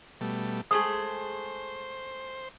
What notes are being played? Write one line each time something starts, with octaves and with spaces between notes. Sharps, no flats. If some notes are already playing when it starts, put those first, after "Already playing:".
B2 G3 A3
G#3 A3 G#4 C5 D#6